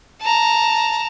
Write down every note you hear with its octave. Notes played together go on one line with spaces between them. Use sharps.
A5 A#5